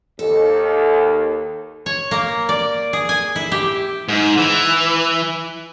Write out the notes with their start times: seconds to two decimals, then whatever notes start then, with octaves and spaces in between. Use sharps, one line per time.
0.19 D#2 A4
1.86 C#5
2.11 A#3
2.49 D5
2.93 G#4
3.09 G#5
3.36 E4
3.52 G4
4.08 G#2
4.37 E3